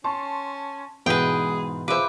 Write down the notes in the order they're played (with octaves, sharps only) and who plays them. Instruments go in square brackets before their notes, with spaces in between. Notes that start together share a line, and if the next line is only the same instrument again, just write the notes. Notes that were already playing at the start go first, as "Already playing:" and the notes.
[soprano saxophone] C#4 [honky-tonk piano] A5 C6 C#6
[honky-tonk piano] G#2 [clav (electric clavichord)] B2 E3 B3 [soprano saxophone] G#4 [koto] B4 G5
[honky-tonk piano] F4 G#4 C5 [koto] B4 E5 [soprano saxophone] D6